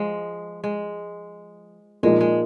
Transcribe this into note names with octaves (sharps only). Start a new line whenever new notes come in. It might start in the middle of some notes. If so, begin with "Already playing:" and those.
Already playing: F3 G#3
G#3
A#2 F3 G#3 A#3 D#4
G#3